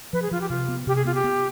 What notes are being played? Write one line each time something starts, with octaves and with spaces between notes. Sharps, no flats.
F3 B4
G#4
F3 F4
G4
C3 F4
B3
C3 G4
G#4
B3 F4
G4
B3